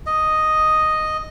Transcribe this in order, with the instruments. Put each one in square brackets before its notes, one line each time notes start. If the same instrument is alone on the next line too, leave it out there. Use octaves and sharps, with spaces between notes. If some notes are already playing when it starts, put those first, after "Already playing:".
[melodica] D#5